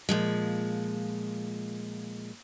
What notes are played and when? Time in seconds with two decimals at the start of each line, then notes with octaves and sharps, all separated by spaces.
0.09 A#2 F3 G#3